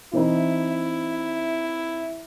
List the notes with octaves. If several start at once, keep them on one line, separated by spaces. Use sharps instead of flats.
E3 C4 D#4 E4